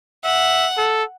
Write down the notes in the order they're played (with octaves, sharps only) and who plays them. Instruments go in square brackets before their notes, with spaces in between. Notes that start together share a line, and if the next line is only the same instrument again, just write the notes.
[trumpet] E5 [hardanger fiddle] F#5
[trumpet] A4